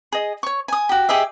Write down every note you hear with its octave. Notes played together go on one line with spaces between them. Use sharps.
G#4 D#5
C#5 C#6
G#5 D#6
F#4 G4
G4 G#4 D#5 E5